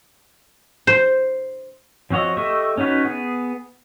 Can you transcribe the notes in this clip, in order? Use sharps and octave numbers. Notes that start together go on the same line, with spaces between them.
C5
F3 C4 F#4 C#5 D#5
A3 G4 D#5 E5 C#6
C#4 D#4 F#4 B4 C#5
B3 G#4